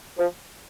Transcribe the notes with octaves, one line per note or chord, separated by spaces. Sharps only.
F3